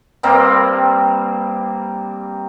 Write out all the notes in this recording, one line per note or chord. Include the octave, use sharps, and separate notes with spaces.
G2 G3 A#3 C4